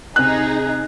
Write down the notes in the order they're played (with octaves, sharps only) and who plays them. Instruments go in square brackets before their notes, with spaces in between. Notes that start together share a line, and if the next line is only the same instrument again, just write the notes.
[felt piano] C3 F#6 [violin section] D#4 G#4